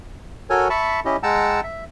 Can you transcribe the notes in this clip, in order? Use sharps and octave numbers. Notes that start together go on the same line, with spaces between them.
F#4 A4 A#4 C#5 G#5
E5 A5 B5 C#6
C#4 E4 G4 D#5
G#3 F#5 G5 A5 A#5 E6
E5